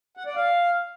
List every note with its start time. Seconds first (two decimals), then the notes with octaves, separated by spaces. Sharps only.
0.17 F#5
0.26 D5
0.36 F5